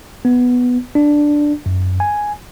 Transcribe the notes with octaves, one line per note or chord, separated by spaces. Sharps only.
B3
D4
F#2
G#5